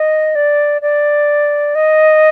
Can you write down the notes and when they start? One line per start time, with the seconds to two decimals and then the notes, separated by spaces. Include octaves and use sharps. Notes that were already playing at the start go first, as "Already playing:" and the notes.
Already playing: D#5
0.35 D5
0.82 D5
1.75 D#5